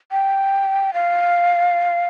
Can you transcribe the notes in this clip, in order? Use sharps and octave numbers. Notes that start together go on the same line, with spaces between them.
G5
F5